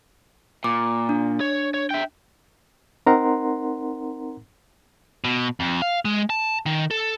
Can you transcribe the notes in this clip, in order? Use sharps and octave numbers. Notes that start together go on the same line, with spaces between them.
A#2 D6
D4
C#5
C#5
E5 G5
C4 D#4 A#4 F#5 A#5 C6
B2
F2
F5
G#3
A5
D#3
A4